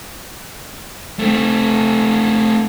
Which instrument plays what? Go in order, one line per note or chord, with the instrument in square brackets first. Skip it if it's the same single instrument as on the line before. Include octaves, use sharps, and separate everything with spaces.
[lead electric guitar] A3 C4